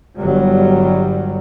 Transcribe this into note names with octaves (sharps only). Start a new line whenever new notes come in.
G1 F#3 G3